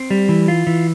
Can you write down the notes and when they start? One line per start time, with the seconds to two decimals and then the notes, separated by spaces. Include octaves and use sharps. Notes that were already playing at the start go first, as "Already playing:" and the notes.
Already playing: C4
0.10 G3
0.29 E3
0.48 F4
0.67 E3